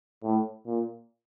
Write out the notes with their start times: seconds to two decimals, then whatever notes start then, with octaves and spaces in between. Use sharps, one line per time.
0.23 A2
0.67 A#2